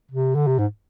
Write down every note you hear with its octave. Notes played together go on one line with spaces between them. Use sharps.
C3
D3
C3
G#2